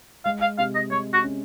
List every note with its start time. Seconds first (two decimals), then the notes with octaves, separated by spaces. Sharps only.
0.25 G#3 F5
0.41 F5
0.58 C3 F5
0.75 D#5
0.91 G#3 C#5
1.13 F#4
1.23 C#4